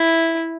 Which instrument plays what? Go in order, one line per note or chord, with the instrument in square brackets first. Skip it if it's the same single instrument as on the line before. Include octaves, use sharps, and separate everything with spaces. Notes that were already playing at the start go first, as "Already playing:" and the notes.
Already playing: [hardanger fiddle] E4